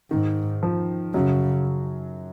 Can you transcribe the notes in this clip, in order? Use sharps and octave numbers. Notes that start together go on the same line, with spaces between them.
G#2 D#3
F3
F#2 C#3 F#3